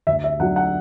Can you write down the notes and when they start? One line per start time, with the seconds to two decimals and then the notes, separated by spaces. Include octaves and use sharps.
0.07 D2 E5
0.24 E5
0.40 D3 F#3 F#5
0.56 F#5